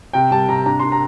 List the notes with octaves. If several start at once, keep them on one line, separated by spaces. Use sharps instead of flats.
C3 G5
G3 A5
C3 A#5
D4 A#5
D4 C6
A#5